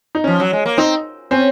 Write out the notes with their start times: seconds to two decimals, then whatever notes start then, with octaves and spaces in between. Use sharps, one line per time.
0.15 D#4
0.24 F3 C#4
0.40 F#3
0.53 G#3
0.66 A#3
0.78 C4 D#4
1.31 C4 C#4